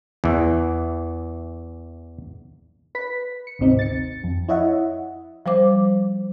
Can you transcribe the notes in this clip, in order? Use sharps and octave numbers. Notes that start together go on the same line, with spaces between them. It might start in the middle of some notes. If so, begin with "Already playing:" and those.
E2 E3
B4 B6
C#7
G#1 D2 C3 C4 D#4
A6 C#7
F2
E4 C#5 D#5 E5 F#5
F3 G3 C5 D6